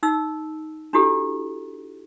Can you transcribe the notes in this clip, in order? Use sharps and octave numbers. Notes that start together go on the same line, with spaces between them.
D#4 E6
D4 E4 F#4 G4 A4